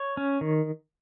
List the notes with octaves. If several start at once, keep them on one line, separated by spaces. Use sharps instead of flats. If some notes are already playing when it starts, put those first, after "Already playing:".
Already playing: C#5
C#4
D#3